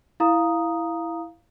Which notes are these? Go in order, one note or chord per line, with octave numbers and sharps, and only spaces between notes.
E4 F5 A#5 D#6